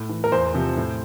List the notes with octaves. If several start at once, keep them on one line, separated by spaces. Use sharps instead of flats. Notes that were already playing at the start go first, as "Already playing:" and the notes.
Already playing: A2
E3
A#4
E2 C5
C3 F3
A2